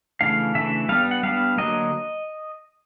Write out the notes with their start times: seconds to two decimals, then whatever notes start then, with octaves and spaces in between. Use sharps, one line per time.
0.21 C#3 E3 A3 D4 F5
0.55 C#3 E3 A3 D4 E5
0.89 G3 B3 D4 F5
1.11 F#5
1.23 G3 B3 D4 F5
1.58 D3 F#3 A#3 D#5